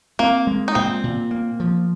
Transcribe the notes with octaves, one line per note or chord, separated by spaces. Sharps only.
A#3 C4
G#3
D#4
A#2 C4
A#2
A#3
F3